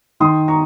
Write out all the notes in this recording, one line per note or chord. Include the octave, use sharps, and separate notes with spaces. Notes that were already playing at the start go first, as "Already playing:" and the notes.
D#3 C6 D#6
A#5 C#6